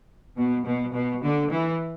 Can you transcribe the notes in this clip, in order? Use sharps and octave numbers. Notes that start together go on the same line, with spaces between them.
B2
B2
B2
D3
E3